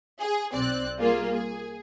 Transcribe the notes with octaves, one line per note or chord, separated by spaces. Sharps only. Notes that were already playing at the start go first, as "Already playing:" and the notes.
G#4
B1 C4 D5 F#6
G3 A#3 F4 G#4
G#4